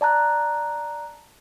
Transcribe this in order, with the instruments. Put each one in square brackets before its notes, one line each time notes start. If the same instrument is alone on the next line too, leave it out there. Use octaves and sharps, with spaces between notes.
[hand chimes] D5 A5 A#5 F#6